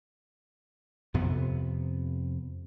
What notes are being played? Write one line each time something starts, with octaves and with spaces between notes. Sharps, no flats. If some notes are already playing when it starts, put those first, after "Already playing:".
F2 C3 B3